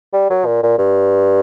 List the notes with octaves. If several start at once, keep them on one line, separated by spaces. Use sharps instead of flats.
G3
F#3
A#2
A#2
G2